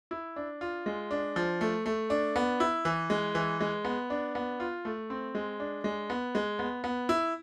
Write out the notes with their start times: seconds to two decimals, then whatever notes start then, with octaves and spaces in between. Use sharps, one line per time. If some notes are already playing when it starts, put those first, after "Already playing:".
0.11 E4
0.36 D4
0.61 F4
0.86 G#3
1.11 D4
1.36 F3
1.61 A3
1.86 A3
2.10 D4
2.36 B3
2.60 E4
2.85 E3
3.10 G#3
3.35 E3
3.60 G#3
3.85 B3
4.10 D4
4.35 B3
4.60 F4
4.85 A3
5.10 C4
5.35 G#3
5.60 D4
5.84 G#3
6.10 B3
6.35 G#3
6.59 B3
6.84 B3
7.09 E4